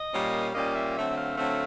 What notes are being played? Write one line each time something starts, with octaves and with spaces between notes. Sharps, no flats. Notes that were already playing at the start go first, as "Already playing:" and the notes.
Already playing: D#5
A#2 G3 A#3 C#4
A#2 G3 A#3 C#4 D#5
E5
D3 F#3 A3 C4 E5
F5
D3 F#3 A3 C4